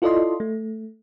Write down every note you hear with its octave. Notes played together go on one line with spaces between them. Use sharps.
E4 F4 A4 D5 D#5 C6
A3